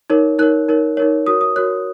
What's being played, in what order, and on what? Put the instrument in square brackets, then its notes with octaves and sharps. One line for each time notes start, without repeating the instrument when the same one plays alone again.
[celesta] D#4 A#4 C#5
D#4 A#4 C#5 F#6
D#4 A#4 C#5
D#4 A#4 C#5
F#4 A#4 C#5 D#6
D#6
F#4 A#4 C#5 F#6